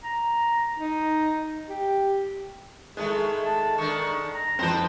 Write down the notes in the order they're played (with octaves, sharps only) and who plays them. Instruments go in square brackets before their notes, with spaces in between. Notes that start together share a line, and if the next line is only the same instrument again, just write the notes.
[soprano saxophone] A#5
D#4
G4
[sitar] D#3 A3 [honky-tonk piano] G#3 [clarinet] G#4
[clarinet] A5
[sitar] D#3 D4 [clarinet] C#6
[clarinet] A#5
[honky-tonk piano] F2 F3 [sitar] B4 C5